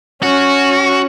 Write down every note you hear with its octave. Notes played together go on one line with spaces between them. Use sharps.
C#4 F#4